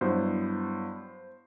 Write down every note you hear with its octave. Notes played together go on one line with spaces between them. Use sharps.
G2 F#3 B3 E4 C5